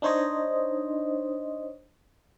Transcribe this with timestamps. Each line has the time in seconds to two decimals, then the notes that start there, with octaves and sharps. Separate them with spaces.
0.02 D4 D#4 C5 C#5 D#5